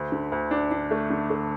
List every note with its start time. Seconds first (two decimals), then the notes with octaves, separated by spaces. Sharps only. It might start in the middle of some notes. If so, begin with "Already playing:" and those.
Already playing: D2
0.12 D3
0.32 D2
0.51 D4
0.71 D4
0.91 A3
1.10 D3
1.30 A3